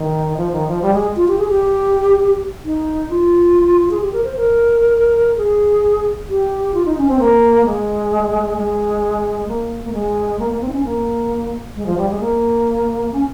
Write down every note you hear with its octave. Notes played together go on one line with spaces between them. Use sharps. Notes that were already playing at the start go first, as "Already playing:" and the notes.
Already playing: D#3
F3
D#3
F3
G3
G#3
F4
G4
G#4
G4
D#4
F4
G#4
G4
A#4
C5
A#4
G#4
G4
F4
D#4
C#4
C4
A#3
G#3
G#3
A#3
A#3
G#3
A#3
A#3
C4
D#4
C#4
A#3
G#3
F3
G3
G#3
A#3
C#4